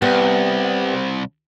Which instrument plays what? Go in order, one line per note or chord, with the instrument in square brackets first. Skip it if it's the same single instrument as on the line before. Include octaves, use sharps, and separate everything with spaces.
[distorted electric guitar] C2 [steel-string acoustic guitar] G3 B3 B4